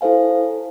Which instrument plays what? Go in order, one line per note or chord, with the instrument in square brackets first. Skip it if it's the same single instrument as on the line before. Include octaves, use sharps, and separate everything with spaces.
[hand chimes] E4 A4 C5 F5 G#5